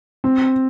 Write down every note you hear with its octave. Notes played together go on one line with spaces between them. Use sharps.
C4